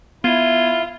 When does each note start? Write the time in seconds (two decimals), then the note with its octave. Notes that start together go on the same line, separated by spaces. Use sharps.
0.24 B3 E4 F4 G#6 D#7